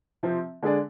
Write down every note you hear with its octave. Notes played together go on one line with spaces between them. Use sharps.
C3 F3 C4
D3 G#3 D4 G#4 D5